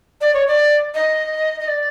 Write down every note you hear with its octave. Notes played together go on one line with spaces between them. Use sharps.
D5
C#5
D5
D#5
D#5
D5